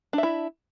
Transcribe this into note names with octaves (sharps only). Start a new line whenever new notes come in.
D4 E4 E5